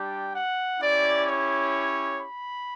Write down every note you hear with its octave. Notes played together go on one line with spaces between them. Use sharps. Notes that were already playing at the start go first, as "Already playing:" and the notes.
Already playing: G3 D4 G4 G5
F#5
C#4 E4 G4 D5
C#5
B5